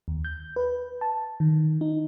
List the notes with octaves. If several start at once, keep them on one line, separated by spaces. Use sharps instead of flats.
D#2
G6
B4
A5
D#3
D#4